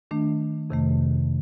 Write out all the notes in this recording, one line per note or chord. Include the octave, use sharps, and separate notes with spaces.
D#3 A3 D4
F2 C3 D#3 A3